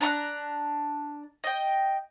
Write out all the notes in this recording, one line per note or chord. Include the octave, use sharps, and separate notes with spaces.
D4 A#5 C#6 F#6
D#5 G5